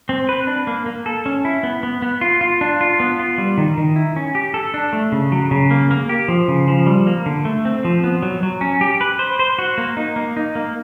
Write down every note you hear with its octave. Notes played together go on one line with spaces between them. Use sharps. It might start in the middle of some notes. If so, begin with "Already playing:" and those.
C4
B4
D4
A#3
A#3
A4
C#4
E4
B3
B3
B3
F4
F4
D4
F4
B3
F4
G3
D#3
D#3
E4
C#4
G4
A4
D4
A3
C#3
F#3
C#3
A#3
A#3
G4
F3
C#3
F3
G3
A#3
D3
A3
C4
F3
B3
F#3
F#3
C#4
G4
B4
C5
C5
F#4
A#3
D#4
A#3
D#4
A#3